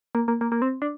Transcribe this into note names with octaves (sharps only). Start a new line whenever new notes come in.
A#3
A#3
A#3
A#3
C4
D4